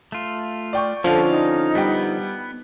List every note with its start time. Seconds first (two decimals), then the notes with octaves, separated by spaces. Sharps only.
0.12 A3 F4
0.73 D5 G5 C#6
1.04 D3 F3 C#4 A4 F5
1.28 D#4
1.75 G3 B3 G5